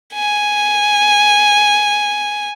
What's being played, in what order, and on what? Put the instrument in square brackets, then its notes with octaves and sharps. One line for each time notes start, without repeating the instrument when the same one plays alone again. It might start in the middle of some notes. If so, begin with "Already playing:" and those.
[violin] G#5